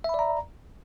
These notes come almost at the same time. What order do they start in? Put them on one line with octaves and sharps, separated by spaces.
E5 B5 D5 A#5